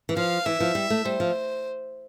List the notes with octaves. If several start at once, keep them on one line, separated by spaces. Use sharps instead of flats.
E3
F3 F5
E3 E5
F3
G3
A3
G3 C5
F3